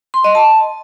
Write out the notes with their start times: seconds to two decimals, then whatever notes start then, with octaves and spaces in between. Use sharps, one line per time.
0.14 C6
0.24 D#5
0.35 A5